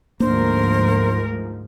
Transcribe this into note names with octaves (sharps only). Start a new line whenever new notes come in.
D2 G#2 F3 A#3 D4 A#4 C5